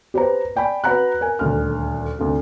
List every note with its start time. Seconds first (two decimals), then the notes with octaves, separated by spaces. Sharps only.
0.14 G4 B4 C5 A#5
0.56 D5 G5 G#5 B5
0.84 F#4 B4 F#5 A#5 B5 F#6
1.21 A#4 G#5
1.39 D#1 D2 F6
2.19 D2 C3